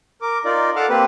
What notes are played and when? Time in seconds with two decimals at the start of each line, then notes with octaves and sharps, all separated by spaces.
0.22 A#4 D6
0.45 D#4 F4 A#4 D5
0.76 A4 F5 F#5 A5 D6 F6
0.89 A#3 C4 G4 B4